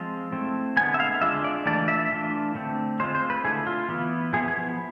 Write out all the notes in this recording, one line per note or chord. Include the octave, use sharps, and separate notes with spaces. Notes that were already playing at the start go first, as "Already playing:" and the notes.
Already playing: F3 G#3 C4 F4
A3 C4 E4
D3 G#3 B3 G#5
E5
F5
G#3 D4 F4 E5
D5
E3 A3 D4 F4 D5
E5
E3 A3 D4 F4
D3 A3 C4
G#3 C4 F4 C5
C5
B4
D3 A3 E4 G#4
F4
E3 B3 E4
F3 B3 E4 G#4
G#4